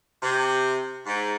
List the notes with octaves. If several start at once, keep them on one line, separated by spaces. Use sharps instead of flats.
C3
G#2